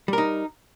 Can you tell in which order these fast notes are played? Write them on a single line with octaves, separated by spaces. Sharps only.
G3 A#4 D#4